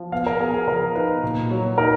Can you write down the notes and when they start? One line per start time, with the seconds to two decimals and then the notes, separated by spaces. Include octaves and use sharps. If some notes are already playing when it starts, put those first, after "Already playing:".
Already playing: F3
0.12 B3 F5
0.26 A#4
0.40 B3 G#4
0.54 G#4
0.68 F3 A#4
0.95 D#4 B4
1.23 A#2
1.51 F#3
1.78 D#4 A#4